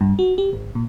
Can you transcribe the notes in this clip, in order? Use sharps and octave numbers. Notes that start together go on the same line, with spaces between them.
G2
F#4
G4
G#1
A#2